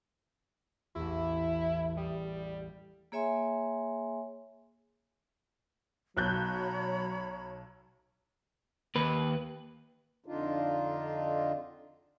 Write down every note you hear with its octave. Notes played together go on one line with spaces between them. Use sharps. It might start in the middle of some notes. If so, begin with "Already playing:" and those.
A1 E2 E4
G3 D#6
A#3 G#4 C#5 E5 G#5 C6
B1 F#3 C#5 A#5 B5 F#6 G6
D#2 B4
F2 D3 D4 D#4 F4